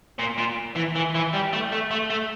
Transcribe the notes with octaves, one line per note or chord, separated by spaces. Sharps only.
A#2
A#2
E3
E3
E3
G3
A3
A3
A3
A3